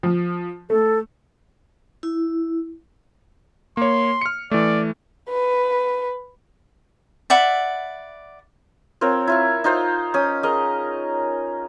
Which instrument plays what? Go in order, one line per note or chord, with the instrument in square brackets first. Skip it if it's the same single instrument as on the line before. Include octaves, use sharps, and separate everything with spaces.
[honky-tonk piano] F3
[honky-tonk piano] A3 [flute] A4
[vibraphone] E4
[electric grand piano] A#3 C#5 [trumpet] C6
[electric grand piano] F6 C#7
[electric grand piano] E3 A3 [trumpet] D5
[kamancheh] B4
[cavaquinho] D5 E5 F#5 B5
[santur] C4 F4 A#4 C#5
E4 F4 C#6
D#4 F4 C5
C#4 D#6
G#4 A#4 D#5